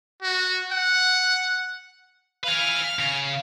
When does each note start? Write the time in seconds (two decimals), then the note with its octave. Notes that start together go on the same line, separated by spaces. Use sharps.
0.23 F#4
0.72 F#5
2.44 B4 F5 G#5 F6
2.99 C#3